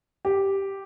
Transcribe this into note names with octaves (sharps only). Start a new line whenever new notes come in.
G4